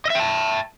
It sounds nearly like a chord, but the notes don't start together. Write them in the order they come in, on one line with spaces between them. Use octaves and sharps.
D#5 E5 G5 A5